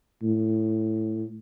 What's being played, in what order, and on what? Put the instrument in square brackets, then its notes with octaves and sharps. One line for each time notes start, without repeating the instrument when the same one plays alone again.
[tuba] A2